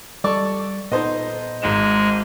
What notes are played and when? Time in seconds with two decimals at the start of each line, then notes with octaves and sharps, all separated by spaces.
0.24 G3 A4 D5 C#6
0.92 A#2 B3 D#4 A4 C5 D#5 C6
1.62 G#1 G#2 G#3 E7